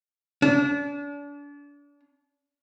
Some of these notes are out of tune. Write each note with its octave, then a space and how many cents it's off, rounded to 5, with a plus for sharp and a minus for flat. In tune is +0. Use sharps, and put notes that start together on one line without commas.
D4 -35